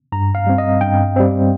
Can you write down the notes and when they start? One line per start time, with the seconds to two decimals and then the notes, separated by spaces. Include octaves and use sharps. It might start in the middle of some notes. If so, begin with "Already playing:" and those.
0.12 G2 A#5
0.35 F5
0.47 G3 C4
0.58 D#5
0.81 G2 G5
1.16 G3 C4